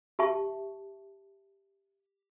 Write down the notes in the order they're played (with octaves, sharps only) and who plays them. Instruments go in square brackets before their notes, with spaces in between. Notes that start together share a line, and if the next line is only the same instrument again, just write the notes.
[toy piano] G4 E5 A5 C#6